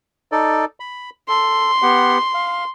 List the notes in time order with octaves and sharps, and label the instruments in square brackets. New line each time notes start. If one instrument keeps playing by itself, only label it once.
[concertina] D#4 A4 D5
B5
[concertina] A4 [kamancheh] C6
[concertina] B3 G4 F#5
F5